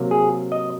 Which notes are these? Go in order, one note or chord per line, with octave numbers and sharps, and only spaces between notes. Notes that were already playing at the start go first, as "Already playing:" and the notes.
Already playing: C3 F#3 A#3
G#4
D#5